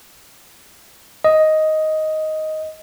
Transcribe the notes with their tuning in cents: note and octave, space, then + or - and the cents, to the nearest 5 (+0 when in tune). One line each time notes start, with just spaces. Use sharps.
D#5 +5